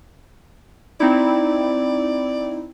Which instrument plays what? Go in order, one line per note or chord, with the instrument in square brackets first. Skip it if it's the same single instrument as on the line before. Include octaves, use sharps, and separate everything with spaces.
[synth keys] C4 D#4 E4 [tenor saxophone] D5